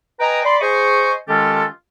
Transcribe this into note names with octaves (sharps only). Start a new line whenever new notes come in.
B4 D#5 G5 G#5 A#5
D5 B5 C6
G#4 C5 D#5 G#5 C#6
D#3 G#3 C#4 F4 G4 A4